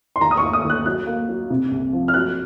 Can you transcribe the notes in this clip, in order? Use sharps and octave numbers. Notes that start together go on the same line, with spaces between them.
C6
D#2 A#5
D#6
C#6
D#2
D#6
D#2
F#6
F#3 F#6
A#3
F#3
C3
C2
F3
F6
F#3 F#6